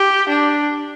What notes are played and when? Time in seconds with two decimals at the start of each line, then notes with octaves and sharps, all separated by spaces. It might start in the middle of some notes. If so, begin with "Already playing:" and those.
Already playing: G4
0.29 D4